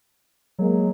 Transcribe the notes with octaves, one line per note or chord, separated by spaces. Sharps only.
F#3 G#3 A#3